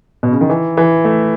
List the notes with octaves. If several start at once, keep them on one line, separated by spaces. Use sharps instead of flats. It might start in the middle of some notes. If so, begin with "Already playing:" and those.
B2
C#3
D#3
E3
E3
A3